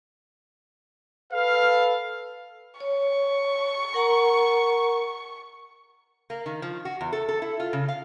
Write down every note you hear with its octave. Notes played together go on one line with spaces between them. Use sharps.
A4 B4 F5
C#5 C#6
A#4 F#5 A#5
A#3
D#3
F3
F#4
E2
A4
A4
E4
F4
C#3
F5